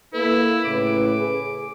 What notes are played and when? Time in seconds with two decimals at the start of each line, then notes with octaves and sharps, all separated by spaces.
0.13 A#3 E4 A4 B4
0.64 A2 C#3 B4 D6
1.17 G#4